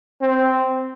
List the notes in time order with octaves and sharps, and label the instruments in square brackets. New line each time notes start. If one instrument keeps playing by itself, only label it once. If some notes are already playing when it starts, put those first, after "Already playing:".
[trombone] C4